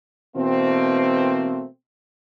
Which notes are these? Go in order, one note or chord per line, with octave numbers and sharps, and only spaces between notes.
B2 E3 A3 A#3 C4